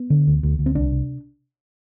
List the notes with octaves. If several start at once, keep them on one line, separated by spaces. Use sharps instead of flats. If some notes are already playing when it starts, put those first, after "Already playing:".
Already playing: B3
D3
D2
D2
D2
C4
C2 D4
C3